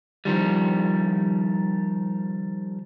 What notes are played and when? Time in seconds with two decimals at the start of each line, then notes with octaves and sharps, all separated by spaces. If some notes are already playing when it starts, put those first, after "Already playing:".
0.25 D#3 F3 G3